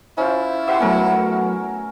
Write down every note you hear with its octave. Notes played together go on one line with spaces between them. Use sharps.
C#4 E4 F4 C5
G4 C5 E5 F#5 E6
F#3 A3 B3 C#4 A#4